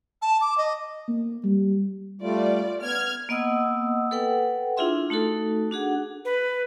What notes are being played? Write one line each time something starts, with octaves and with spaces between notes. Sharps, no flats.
A5
D6
D#5
A#3
G3
G3 A3 F4 D5
B3 F6 G#6
A#3 B3 D#5 F#5 D#6 E6
A4 B4 F#5 G5
D4 E4 F4 G#4 E5 C6
A3 D#4 F#4 A4
D4 F#4 G#4 F#5
B4